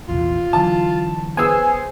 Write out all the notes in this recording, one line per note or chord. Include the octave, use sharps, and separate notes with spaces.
A#1 E2 C3 F4
D3 E3 F#3 A5
B3 G#4 C5 G#5 E6